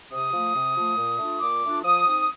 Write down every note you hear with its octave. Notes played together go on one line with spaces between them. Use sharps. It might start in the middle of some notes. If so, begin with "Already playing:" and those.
C3 D#6
F3 A3
C3
F3 A3
A#2
A3 D4 F4
A#2 D6
A3 D4 F4
F3 D#6
C4 D#4